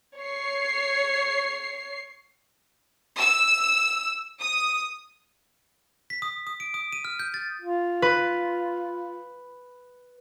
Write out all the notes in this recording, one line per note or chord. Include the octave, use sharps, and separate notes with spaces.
C#5 C7
E6
D#6
B6
D#6
D#6
D7
D#6
D#7
F6
G6
A6
F4
B4